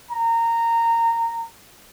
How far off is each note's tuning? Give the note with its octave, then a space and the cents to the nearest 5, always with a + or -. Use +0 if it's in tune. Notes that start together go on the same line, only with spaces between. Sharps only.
A#5 -20